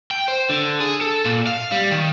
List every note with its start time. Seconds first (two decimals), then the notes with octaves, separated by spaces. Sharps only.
0.11 G5
0.28 C5
0.49 D3
0.80 G#4
1.01 A4
1.25 A#2
1.46 F5
1.72 G3
1.92 D#3